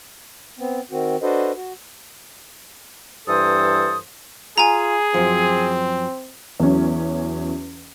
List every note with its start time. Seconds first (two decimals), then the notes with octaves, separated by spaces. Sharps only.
0.59 B3 C4
0.91 D#3 C4 F#4
1.23 D4 F#4 A4 B4 C5 D#5
1.56 F#4
3.28 G2 E3 A4 C5 D#6
4.58 F4 G#4 G#5 A#5
5.14 F#2 F3 C4
6.60 E2 F#3 C#4